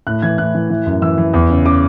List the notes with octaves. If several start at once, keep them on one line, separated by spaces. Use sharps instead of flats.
A2 F#6
E3 G#6
A2 F#6
E3
E3
F#2
E3 E6
E3
E2
C#3
C#3 D6